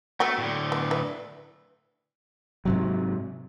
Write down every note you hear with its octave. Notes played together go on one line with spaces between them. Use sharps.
A3 B3 F#4 G5
A2 D3
B3
B4 E5
G#2 C3 F#3